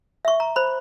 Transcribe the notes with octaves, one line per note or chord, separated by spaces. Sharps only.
E5 C#6
A#5
C5 B5